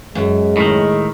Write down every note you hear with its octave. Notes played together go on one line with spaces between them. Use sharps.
F#2 G#3
A2 D#3